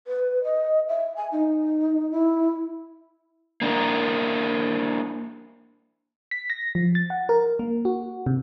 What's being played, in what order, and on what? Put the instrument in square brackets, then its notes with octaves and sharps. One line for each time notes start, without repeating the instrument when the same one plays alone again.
[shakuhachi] B4
D#5
E5
G#5
D#4
E4
[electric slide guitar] A#3 D4 E4 A#4
[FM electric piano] B6
A#6
F3
A6
F#5
A#4
A#3
F#4
C3